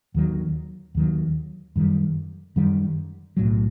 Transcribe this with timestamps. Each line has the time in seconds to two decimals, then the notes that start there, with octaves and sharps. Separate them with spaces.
0.14 D#2 D#3 F#3
0.95 D#2 D#3 F#3
1.76 F#2 D#3 G3
2.56 F#2 D#3 G3
3.37 B1 A2 F#3